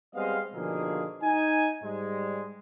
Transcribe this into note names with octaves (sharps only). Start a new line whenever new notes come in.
G3 G#3 B3 C4 D#5 F5
B2 D3 D#3 F3 A#3 G#4
D#4 G#5
G#2 G3 G#3